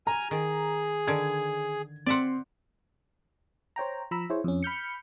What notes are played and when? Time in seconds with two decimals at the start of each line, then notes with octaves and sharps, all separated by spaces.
0.07 G#5 A#5 F6
0.31 D#3 G#4
1.07 D3 D#3 G#6
2.06 C4 D5 E5 F#5 C6
3.76 C5 C#5 G5 A#5
4.11 F3 A#5 B5 E6
4.30 E4 G#4 C5 C#5
4.44 F2 C#4
4.63 B5 F6 G6 C#7